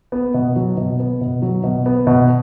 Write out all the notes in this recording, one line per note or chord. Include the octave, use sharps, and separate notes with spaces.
B3
B2
F#3
B2
B3
B2
F#3
B2
B3
B2